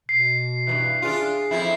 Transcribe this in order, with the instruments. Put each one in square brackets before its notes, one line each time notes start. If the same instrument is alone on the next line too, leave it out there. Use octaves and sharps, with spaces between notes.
[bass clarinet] B2 [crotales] C7
[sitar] G2 A#2 E3
[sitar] D4 F4 [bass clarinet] G#4
[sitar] F2 F3 E4